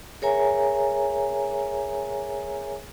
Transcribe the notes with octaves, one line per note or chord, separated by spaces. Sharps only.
G#4 A#4 C#5 E5 G#5 A#5